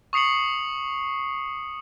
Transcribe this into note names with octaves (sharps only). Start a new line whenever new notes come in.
C#6 D#6 C7 C#7 F#7